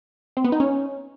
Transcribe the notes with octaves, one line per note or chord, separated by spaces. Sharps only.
C4
B3
D#4
C#4